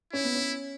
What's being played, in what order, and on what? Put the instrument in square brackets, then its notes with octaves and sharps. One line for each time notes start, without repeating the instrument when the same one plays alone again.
[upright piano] C#4 [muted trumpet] E4
[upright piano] B3
C#4